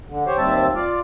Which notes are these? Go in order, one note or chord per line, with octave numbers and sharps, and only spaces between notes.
D3
G4 C5 C#5
D#2 G3 C4 E5 A5
F4 D5 F5